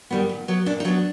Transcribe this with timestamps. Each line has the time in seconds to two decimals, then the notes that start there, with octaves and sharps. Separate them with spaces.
0.10 D#3 G3 B3
0.29 A#2
0.48 F#3 B3
0.66 A#2 D4
0.80 D#4
0.85 F#3 B3 D4